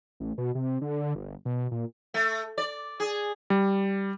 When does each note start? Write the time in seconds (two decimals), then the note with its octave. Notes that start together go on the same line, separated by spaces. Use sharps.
0.20 A1
0.38 B2
0.55 C3
0.81 D3
1.15 G1
1.45 B2
1.71 A#2
2.14 A3
2.58 D5
3.00 G#4
3.50 G3